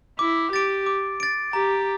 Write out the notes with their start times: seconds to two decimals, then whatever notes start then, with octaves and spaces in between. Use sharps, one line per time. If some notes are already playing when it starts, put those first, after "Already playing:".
0.19 E4 D6
0.52 G4 A6 D7
0.86 D6
1.20 A6 D7
1.53 G4 A#5